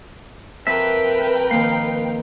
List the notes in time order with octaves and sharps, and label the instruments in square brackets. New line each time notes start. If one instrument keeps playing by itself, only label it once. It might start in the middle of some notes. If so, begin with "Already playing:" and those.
[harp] F2 [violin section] A#4 B4 G5 [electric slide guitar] E5
[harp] D#3 F3 A#3 [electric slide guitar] F5